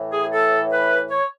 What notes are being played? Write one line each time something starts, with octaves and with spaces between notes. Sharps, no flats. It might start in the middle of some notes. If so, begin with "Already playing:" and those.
Already playing: A2 E3
G#4
A4
B4
C#5